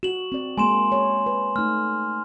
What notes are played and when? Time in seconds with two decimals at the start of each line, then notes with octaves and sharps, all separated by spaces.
0.03 F#4 E7 F#7
0.32 C4 D5
0.58 G#3 A#3 G#5 C6 E7
0.92 C#5
1.26 B4
1.56 A3 D#4 F6